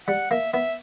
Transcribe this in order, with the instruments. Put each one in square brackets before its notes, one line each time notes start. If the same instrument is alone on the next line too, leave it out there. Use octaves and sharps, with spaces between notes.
[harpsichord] G3 [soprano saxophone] F#5
[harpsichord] A#3 [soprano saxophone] E5
[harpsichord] B3 [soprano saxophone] E5